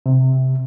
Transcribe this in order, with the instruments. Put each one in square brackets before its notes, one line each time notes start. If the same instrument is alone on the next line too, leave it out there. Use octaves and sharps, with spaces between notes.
[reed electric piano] C3